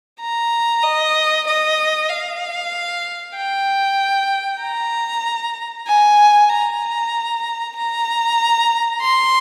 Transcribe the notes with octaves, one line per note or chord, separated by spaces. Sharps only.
A#5
D#5
D#5
F5
G5
A#5
G#5
A#5
A#5
C6